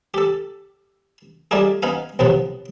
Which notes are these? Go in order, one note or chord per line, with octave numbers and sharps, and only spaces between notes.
G4 A4
G3 A3 D4 D#4 F4 G#4
B3 D#4 F5 G#5
B1 A2 C3 F3 B3